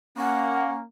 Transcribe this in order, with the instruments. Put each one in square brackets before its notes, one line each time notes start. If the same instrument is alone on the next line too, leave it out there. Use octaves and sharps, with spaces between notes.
[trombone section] A#3 [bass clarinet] C#4 [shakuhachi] F#5